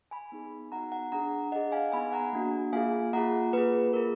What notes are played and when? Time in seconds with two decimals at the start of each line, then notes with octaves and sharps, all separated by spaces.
0.11 G#5 B5
0.32 B3 D#4 G#4
0.72 B3 D#4 F#4 F#5 A#5
0.92 F#5 A#5
1.12 D4 G#4 F#5 A#5
1.52 D4 G#4 D#5 F#5
1.72 F5 G#5
1.92 B3 D#4 G#4 G#5 B5
2.12 F#5 A#5
2.33 A#3 D4 F#4
2.73 A#3 F4 G#4 F5 G#5
3.13 A#3 F4 G#4 F#5 A#5
3.53 A#3 F4 G#4 B4
3.93 A#3 F4 G#4 A#4